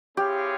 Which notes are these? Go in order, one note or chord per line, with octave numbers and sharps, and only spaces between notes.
C4 E4 G4 G#4 C#5 F5